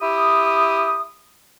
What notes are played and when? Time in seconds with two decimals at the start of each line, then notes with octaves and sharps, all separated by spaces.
0.02 E4 G4 D#6